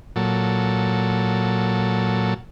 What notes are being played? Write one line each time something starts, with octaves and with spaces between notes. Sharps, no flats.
A#2 F#3 A4